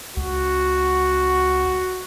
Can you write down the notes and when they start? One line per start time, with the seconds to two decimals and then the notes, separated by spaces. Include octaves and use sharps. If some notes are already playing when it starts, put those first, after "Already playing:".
0.17 C#2 F#4